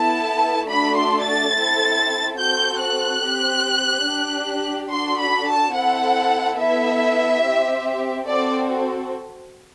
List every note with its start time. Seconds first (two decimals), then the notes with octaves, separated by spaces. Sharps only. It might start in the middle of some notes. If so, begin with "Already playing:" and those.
Already playing: B3 E4 A4 A5
0.68 A3 D4 F#4 A4 B5
0.97 C6
1.25 A6
1.53 C4 E4 A4
2.38 C4 F#4 A4 G6
2.80 F#6
3.22 C4 G4
4.05 D4 G4
4.90 D4 F#4 A4 C6
5.19 B5
5.47 A5
5.74 C4 E4 A4 F#5
6.59 B3 E4 A4 E5
7.43 C4 G4
8.28 C4 F#4 A4 D5